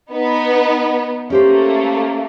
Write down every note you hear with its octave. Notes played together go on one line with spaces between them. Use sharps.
B3 D#4 B4
A3 A#3 C#4 G4 C5